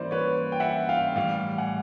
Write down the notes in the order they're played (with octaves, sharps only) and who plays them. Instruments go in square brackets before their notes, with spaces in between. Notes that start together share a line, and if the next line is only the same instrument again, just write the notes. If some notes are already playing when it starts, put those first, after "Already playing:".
Already playing: [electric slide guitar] E3 G3 A#3 C#4 E4 [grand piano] C5 D5
[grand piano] B4 C#5
G5
E5 F#5
F5 G5
[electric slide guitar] A2 E3 G3 [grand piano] F5 G5
[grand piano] F#5 G#5